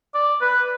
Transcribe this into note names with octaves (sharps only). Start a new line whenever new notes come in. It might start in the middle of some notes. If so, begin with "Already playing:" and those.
D5
B4